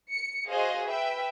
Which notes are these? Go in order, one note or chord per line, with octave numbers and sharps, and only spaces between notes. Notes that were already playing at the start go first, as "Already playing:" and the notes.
C#7
F#4 G#4 C5 D#5 F5
B4 E5 G5